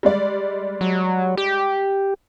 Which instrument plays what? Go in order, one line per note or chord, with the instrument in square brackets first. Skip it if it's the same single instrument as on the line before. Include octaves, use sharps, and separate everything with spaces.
[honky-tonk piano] G3 G#3 D5
[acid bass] F#3
G4